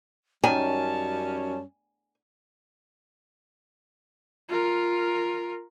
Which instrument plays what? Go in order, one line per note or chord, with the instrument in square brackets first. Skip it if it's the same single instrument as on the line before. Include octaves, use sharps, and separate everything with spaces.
[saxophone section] F#2 G3 C#4 [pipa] D#3 [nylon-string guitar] G#5 [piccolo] A5
[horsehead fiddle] F4 A#4